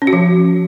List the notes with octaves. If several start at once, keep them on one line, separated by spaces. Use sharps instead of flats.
C#4
F#4
F3